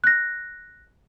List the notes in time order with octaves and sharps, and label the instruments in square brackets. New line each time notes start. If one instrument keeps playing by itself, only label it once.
[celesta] F#6 A#6